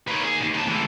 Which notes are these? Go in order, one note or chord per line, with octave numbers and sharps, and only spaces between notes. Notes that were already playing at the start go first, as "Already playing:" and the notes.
A#3 D#4 B4 C#5
G#4
D#2 A#2
D#4 A5
D3 E3 G#3 A3